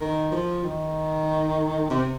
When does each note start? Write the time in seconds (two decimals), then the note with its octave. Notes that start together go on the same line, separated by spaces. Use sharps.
0.01 D#3
0.32 F3
0.64 D#3
1.90 C3